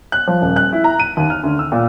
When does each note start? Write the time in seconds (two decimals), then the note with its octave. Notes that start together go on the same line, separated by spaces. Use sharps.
0.12 F#6
0.27 F3
0.42 D#1
0.56 F#6
0.73 E4
0.84 A#5
1.00 D#7
1.17 D#2
1.30 F6
1.44 D2
1.59 E6
1.72 A#2